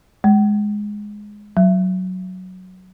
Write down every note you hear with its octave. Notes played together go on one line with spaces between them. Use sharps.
G#3
F#3